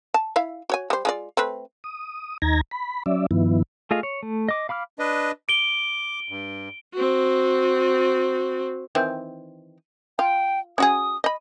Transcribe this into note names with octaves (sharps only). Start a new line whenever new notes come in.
A5
E4 E5 F5
F#4 C#5 G#5
G3 C5
G#3 F4 D5
A3 C4 B4
D#6
D#2 D#4 A#5 G#6 A#6
B5
F#3 C#4 D5 E5
G2 D#3 F3 B3 E4
A3 F4 G#4 D#5 F5
C#5
A3
D#5 D6
F5 B5 D6 F6
D4 B4 D#5
D6 D7 G7
G2
C4 F#4
D#3 E3 C4
F4 G5
C#4 F#4 G#4 D#6
D#5 B5